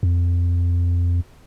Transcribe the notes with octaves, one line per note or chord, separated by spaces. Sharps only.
F2